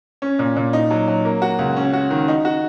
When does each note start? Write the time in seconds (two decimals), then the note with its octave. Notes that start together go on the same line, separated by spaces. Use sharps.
0.22 C#4
0.39 A#2
0.56 A#2
0.73 D#4
0.90 F#3
1.08 F#3
1.25 A#3
1.42 F#4
1.59 C#2
1.77 C#4
1.93 F#4
2.11 D#3
2.28 D#4
2.45 F#4